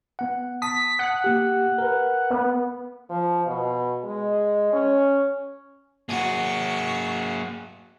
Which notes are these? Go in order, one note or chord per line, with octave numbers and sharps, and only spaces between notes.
B3 F#5
A5 D#6 B6
F#5
A#3 G4
A#4 B4
B3
F3
B2
G#3
C#4
A#3 F#4 G#4